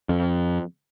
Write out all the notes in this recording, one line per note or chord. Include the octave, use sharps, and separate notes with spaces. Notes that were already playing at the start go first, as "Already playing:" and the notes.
F2